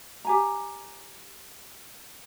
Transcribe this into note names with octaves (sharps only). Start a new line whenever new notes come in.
G4 G#5 A#5